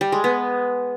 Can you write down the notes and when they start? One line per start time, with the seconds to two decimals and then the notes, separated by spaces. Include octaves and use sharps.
0.01 G3
0.12 G#3
0.24 B3